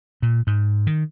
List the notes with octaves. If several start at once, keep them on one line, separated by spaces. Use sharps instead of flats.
A#2
G#2
D#3